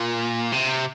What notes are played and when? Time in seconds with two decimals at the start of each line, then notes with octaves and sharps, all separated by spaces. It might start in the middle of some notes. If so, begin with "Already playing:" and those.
Already playing: A#2
0.52 C3